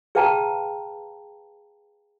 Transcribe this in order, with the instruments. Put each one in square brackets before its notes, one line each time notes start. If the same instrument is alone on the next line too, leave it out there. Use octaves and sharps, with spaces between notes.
[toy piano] G#4 B4 F5 G5 A5 A#5